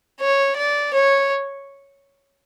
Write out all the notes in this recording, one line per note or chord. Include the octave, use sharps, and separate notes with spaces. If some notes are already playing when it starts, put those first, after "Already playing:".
C#5
D5
C#5